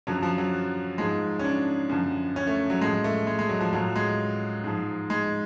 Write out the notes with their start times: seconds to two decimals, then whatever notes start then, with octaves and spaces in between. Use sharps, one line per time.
0.07 F#2 D3 F3 F#3
0.23 F3
0.38 F#3
0.98 G#2 F3 G#3
1.39 C#4
1.44 D4
1.89 F#2 D3 F3
2.36 C#4
2.47 A3
2.70 F#3
2.81 A2 F3 G#3
3.04 A3
3.27 G#3
3.39 G#3
3.49 F#3
3.60 F3
3.73 A2 F3 F#3
3.96 G#3
4.64 G#2 F3
5.10 G#3